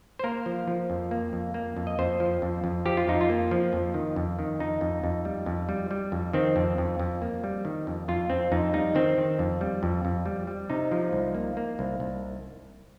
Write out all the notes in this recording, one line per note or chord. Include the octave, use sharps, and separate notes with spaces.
C5
A#3 A#4
F3
F3
F2
A#3
F2
A#3
F2
D#5
F2 C5
F3
F2
F2
F3 G4
F4
F2 D#4
F4
A#3
F3
F2
D#3
F2
D#3
F2 D#4
F2
F2
G3
F2
G3
G3
F2
D#3 C4
F2
F2
F2
A#3
G3
D#3
F2
F2 F4
F2 C4
F2 D#4
G3 D#4
D#3 C4
D#3
F2
G3
F2
F2
G3
G3
C3 D#4
F3
C2
A#3
A#3
C2
C2